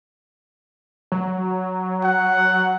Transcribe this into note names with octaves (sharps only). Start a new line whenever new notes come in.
F#3
F#5